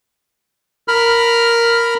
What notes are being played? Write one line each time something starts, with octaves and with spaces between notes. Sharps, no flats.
A#4 B5 F6